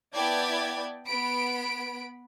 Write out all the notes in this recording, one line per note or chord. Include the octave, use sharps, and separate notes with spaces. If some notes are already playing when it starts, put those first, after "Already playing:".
B3 E4 D5 G5 A5 G#6
B3 B5 D7